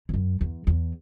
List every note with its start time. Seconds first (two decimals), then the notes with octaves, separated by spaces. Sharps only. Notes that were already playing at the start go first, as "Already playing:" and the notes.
0.09 E2
0.14 F#2
0.41 E2
0.67 E2